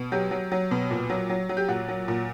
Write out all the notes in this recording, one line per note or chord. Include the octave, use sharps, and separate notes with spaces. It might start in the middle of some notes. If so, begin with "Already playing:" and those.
Already playing: B2
F#3 G4
F#3
F#3
B2
A#2
F#3
F#3
F#3
G4
A#2 F#4
F#3
A#2